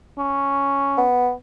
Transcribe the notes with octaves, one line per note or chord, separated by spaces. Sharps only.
C#4
B3